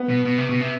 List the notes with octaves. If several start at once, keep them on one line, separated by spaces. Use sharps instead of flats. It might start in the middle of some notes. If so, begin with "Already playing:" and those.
Already playing: B3
B2
B2
C3
B2
C3